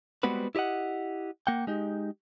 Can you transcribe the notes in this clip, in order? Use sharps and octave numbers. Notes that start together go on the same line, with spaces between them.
G3 G#3 B3 C4 F#4 B4
E4 G4 D5 D#5 F#5
A#3 F#5 G5
G#3 D#4 G4